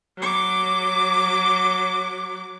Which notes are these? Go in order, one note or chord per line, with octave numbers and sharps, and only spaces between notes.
F#3 D6